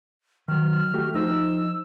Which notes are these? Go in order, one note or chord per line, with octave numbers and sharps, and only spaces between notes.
D#3 F#3 F6
A3 F#4 G4
F3 D#4 C5 E6